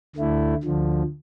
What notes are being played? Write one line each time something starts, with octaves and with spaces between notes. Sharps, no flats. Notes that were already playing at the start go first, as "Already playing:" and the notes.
D2 D3 A3 E4
D2 D3 F3